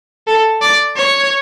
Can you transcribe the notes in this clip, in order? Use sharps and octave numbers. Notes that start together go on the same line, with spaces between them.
A4
D5
C#5